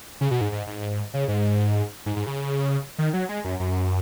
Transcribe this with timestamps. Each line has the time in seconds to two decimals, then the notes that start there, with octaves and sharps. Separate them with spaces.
0.21 C#3
0.31 B2
0.41 G#2
0.52 G#2
0.67 G#2
1.14 C#3
1.28 G#2
2.06 G#2
2.16 G#2
2.26 C#3
2.98 D#3
3.13 F#3
3.29 G#3
3.45 F#2
3.60 F#2